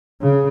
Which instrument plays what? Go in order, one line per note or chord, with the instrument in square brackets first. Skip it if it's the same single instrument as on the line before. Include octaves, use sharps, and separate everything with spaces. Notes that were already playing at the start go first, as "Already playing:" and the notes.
[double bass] C#3